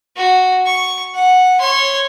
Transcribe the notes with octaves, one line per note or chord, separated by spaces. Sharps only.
F#4
C#6
F#5
C#5 C6